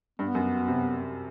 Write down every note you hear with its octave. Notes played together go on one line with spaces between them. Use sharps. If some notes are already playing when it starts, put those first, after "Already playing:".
G2 B3
F#2
C3